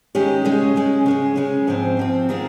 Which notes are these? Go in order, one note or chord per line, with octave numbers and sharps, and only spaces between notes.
D#3 G#3 C#4 G4
C#3 G#3 C#4
C#3 G#3 C#4
C#3 G#3 C#4
C#3 G#3 C#4
G#2 F3 C4
G#2 F3 C4
D#3 G#3 C4 F4